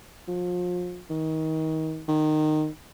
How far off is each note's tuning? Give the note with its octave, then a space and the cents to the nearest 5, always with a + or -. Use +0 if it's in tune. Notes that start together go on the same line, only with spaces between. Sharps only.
F3 +35
D#3 +30
D#3 -15